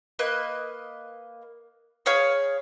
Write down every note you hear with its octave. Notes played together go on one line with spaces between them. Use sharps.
A#3 B4 D#5 F#6
G#4 C#5 F5 B5